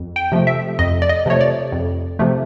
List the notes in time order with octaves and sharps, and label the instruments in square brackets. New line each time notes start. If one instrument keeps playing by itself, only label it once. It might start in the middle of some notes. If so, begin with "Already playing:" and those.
Already playing: [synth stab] F2
G5
C3 F3 A3
E5
F2 D#5
D5
D#5
C3 F3 A3 C#5
D5
F2
C3 F3 A3